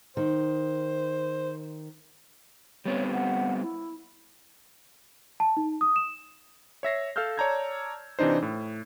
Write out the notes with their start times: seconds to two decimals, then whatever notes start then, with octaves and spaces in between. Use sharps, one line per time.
0.17 D#3 C5
2.85 G3 B3 C4 C#5
3.13 F#5
3.62 E4
5.40 A5
5.57 D#4
5.81 D#6
5.96 E7
6.83 C#5 E5 A#6 C7
7.16 A4 F5 E6 F6 G6
7.37 C#5 D5 A5 A#5 G6 G#6
8.19 C3 E3 D4 D#4 C5
8.42 A2